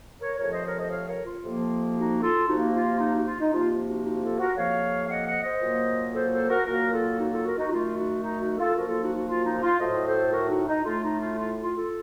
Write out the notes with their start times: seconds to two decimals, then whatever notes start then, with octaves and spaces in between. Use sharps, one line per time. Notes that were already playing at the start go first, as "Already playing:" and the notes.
0.20 A#4 C#5
0.37 F2 C3 F3 A3 A#4 C#5
0.51 C5 D#5
0.64 A#4 C#5
0.78 C5 D#5
0.90 C#5 F5
1.07 A#4 C#5
1.25 F4
1.43 F2 C3 F3 A#3
1.95 D#4 F#4
2.21 F4 A4
2.47 C3 F3 A#3 D#4 F#4
2.74 F4
2.99 D#4
3.12 D#4 F#4
3.26 F4
3.39 D#4
3.51 C3 F3 A#3 F4
3.87 D#4 F#4
4.04 D#4 F#4
4.21 F4 A4
4.38 F#4 A#4
4.56 F2 C3 F3 A#3 C#5 F5
5.05 F5
5.08 D#5 F#5
5.25 D#5 F#5
5.43 C5 D#5
5.61 A#2 F#3 A#3
6.13 A4 C5
6.30 A4 C5
6.48 F#4 A#4
6.65 A#2 F#3 A#3 F#4 A#4
6.92 F4 A4
7.17 D#4 F#4
7.31 F4 A4
7.44 F#4 A#4
7.57 D#4 F#4
7.70 F#2 D#3 A3 F4
7.96 D#4 F#4
8.22 D#4
8.39 D#4 F#4
8.57 F4 A4
8.74 F#2 F3 A#3 F#4 A#4
8.87 F4 A4
9.01 D#4 F#4
9.14 D#4 F#4
9.27 F4
9.44 D#4
9.62 F4
9.79 A2 F#3 A3 C5 D#5
10.05 A4 C5
10.32 F#4 A#4
10.49 D#4 F#4
10.67 D#4
10.84 A2 A3 F4
11.01 D#4
11.19 F4
11.36 F4
11.62 F4
11.75 F4 A4